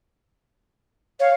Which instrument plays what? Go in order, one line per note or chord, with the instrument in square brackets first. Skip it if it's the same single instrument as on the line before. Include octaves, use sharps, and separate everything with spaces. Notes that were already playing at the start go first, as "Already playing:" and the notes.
[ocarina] C#5 [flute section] F5